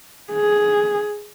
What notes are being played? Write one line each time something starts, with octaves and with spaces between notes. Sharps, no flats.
G#4